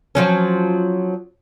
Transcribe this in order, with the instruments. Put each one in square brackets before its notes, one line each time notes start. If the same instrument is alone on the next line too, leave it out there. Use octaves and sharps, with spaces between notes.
[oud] F3 F#3 C#4